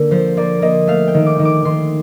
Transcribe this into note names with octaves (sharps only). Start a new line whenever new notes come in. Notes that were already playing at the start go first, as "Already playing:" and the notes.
Already playing: D3 A#3 A#4
F3 C5
A#3 D5
A#3 D#5
A3 F5
G5
D#3
D6
D#3
D6
D#3 C6